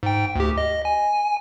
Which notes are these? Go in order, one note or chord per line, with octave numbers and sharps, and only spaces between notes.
G#2 G5
D2 G4
D#5
G#5